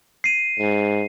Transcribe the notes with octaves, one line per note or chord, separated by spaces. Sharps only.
C7 D#7
G#2